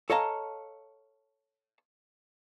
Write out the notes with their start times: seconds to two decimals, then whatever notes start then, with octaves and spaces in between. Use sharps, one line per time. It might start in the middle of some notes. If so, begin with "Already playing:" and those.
0.10 A4 C#5 D#5 F5 A5 A#5